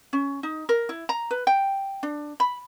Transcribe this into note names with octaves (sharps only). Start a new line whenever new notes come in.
C#4
D#4
A#4
E4
A#5
B4
G5
D4
B5